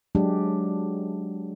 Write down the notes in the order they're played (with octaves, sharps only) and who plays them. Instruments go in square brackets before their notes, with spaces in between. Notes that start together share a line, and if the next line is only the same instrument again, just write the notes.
[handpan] F#3 G#3 D4 G4